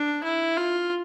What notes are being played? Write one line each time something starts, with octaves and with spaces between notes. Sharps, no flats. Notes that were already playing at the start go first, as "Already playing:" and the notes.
Already playing: D4
E4
F4